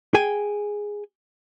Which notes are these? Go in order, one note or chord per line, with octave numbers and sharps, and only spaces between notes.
G#4 G5 G#5